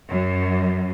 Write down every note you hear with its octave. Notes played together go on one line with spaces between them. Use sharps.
F#2